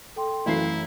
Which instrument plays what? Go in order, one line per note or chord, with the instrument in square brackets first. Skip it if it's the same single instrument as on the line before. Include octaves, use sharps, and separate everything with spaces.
[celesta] A4 G5 C6
[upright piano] F#2 E3 C7 [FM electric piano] A3 [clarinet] E4 [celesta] F5